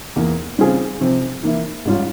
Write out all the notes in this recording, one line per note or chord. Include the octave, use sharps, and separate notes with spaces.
E2 E3 A#3
C#3 G3 C4 F4 G#4
C3 F3 C4
E3 A#3 E4
G#2 G3 C#4 F4